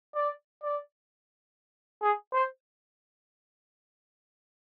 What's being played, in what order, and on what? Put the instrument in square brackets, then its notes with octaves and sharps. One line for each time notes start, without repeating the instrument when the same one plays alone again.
[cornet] D5
D5
G#4
C5